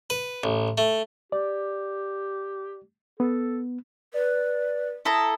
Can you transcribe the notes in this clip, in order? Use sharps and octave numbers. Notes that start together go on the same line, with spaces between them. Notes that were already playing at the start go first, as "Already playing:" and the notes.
B4
A1
A3
G4 D5
B3 A4
B4 D5
E4 A4 A#5 D#6